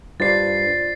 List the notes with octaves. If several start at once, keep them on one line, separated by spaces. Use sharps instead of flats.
G2 F4 C5 D5 A6 C7